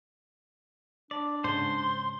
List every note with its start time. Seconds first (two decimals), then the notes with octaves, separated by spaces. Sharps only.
1.11 D4 D5
1.44 G#2 C#3 C5 C6